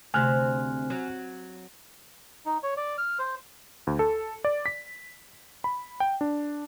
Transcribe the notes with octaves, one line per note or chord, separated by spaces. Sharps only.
D2 C3 G#5 F6 F#6
F#3
D#4
C#5
D5
F6
C5
D2
A4
D5
B6
B5
G5
D4